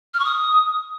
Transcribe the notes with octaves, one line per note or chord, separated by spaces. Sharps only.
F6
C#6
D#6